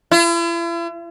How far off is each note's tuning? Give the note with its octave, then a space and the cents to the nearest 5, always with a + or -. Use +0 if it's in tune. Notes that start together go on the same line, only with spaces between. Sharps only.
E4 +45